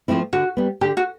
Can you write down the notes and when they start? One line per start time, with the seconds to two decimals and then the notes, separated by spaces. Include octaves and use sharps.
0.08 F3 A3 C4 E4
0.33 D3 F#4
0.57 G3 B3
0.81 D3 G4
0.97 F#4